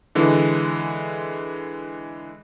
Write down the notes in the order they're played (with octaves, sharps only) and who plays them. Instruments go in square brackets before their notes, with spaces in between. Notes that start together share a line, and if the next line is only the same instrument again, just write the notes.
[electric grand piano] D3 E3 G#3